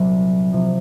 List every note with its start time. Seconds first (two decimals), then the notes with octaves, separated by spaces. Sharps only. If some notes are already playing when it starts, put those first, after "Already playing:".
Already playing: C2 A#2 F#3
0.52 C3 F3